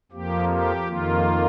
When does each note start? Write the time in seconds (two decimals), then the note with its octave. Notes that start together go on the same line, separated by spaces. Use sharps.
0.12 F2 F3 A#3 G4
0.49 G4
0.87 F2 D#3 A#3 F4